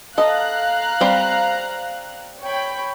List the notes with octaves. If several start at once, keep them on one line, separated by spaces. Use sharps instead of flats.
A4 D#5 F5 A#5 F#6
G3 C4 G4
C#5 G5 B5